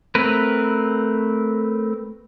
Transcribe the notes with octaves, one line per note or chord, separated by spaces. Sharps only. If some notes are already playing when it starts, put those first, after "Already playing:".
A3 C4 A#4 B4